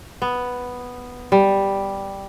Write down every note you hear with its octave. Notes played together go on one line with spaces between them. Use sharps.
B3
G3